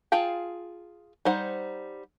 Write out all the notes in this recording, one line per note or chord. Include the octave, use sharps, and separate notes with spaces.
F4 G#4 F5 G5 A5
G3 D#4 C5 F#5